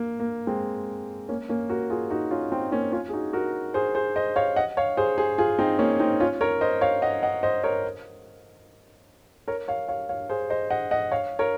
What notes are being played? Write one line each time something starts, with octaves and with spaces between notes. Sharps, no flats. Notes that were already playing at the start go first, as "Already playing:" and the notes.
Already playing: A#3
A#3
G#3 C4
A#3 C#4
A#3 C#4
F#4 A#4
F4 G#4
D#4 F#4
C#4 F4
C4 D#4
A#3 C#4
C#4 F4
G#4
D#4 F#4
F#4 A#4
G#4 C5
G#4 C5
C5 D#5
C#5 F5
D#5 F#5
C#5 F5
G#4 C5
G#4 C5
F4 G#4
C4 D#4
A#3 C#4
C4 D#4
C#4 F4
A#4 C#5
C5 D#5
C#5 F5
D#5 F#5
D#5 F#5
C5 D#5
A#4 C#5
A#4 C#5
C#5 F5
C#5 F5
C#5 F5
G#4 C5
C5 D#5
D#5 F#5
D#5 F#5
C#5 F5
A#4 C#5